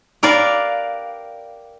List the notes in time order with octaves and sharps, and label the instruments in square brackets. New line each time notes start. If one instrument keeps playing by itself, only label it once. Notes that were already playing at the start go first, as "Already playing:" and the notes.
[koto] G4 A#4 B4 D5 F5